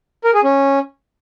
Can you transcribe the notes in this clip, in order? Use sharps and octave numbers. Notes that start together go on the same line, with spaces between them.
A#4
G#4
C#4